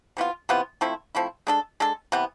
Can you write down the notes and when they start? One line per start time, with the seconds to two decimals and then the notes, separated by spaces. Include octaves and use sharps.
0.17 C3 E3 B3 F4
0.49 C3 E3 B3 F4
0.81 F3 A3 C4 E4
1.15 F3 A3 C4 E4
1.47 G#3 D4 A4
1.80 G#3 D4 A4
2.12 C3 E3 B3